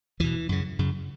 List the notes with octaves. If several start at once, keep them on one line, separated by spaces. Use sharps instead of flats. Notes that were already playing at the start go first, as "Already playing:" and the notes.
E2 B2 E3
F#2 C#3
F#2 C#3